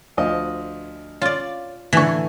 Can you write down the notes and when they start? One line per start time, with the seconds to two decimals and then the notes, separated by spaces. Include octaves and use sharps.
0.17 D2 F3 D#5
1.22 C#4 F4 D5
1.93 A2 D3 E3 G#5 C#6